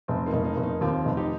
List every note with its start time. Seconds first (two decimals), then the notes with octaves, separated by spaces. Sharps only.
0.08 F1 C4
0.26 A#3 D#4
0.33 F1
0.44 A#3 D#4
0.57 F1
0.63 A#3 D#4
0.81 D#2 C4 F4
1.05 F1
1.17 D#4 G4